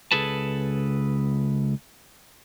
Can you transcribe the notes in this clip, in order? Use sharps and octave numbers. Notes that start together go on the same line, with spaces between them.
C#2 G#4 A4 B4 A5